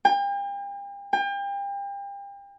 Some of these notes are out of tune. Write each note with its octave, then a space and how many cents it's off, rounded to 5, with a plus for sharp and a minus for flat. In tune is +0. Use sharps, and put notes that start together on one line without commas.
G5 +40
G5 +35